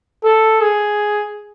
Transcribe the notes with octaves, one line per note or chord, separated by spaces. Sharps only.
A4
G#4